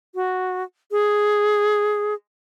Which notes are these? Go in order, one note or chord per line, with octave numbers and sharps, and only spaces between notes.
F#4
G#4